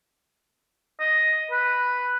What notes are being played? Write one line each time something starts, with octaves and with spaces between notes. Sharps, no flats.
D#5
B4